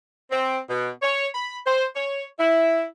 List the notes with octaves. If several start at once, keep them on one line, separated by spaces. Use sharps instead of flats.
C4
B2
C#5
B5
C5
C#5
E4